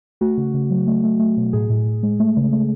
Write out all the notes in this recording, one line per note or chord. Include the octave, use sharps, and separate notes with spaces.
A3 F#4
C#3
C#3
F#3
A3
A3
A3
B2
A2 G#4
A2
A2
G#3
A3
C#3
A3